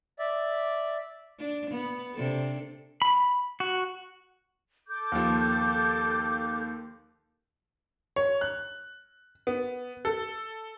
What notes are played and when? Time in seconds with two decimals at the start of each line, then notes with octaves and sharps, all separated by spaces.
0.19 D5 E5
1.39 D4
1.70 B3
2.14 C3 D4 A4
3.02 B5
3.60 F#4
4.88 A4 D6 G6
5.12 D#2 F3
8.16 C#5
8.41 F#6
9.47 B3
10.05 A4